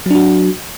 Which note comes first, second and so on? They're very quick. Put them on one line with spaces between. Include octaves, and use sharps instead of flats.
F#3 D4 F#4